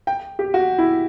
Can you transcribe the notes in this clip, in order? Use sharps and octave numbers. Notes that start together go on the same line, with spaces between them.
G5
G4
F#4
E4